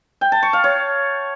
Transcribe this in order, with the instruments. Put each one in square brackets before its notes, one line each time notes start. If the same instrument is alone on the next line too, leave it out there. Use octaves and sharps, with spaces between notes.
[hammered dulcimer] G5
A5
C#6
F5
C#5